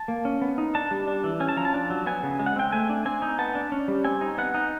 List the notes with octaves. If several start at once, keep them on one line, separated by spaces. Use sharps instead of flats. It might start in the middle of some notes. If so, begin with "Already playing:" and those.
Already playing: A5
A#3
C#4
B3
D#4
D4 A5
G3
D4
E3
C#4 G#5
A5
F3 A#5
A5
D4
F#3
B3 G#5
C#3
G#3
F#5
C4 G5
A3 G#5
D4
C4 G#5
D#4
B3 A5
D4
C#4
G3
C4 G#5
D#4
B3 F#5
D#4